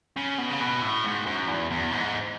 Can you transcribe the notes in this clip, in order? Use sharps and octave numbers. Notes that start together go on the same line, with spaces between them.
C#3
B2
C#3
B2
A2
G#2
F#2
E2
E2
G#2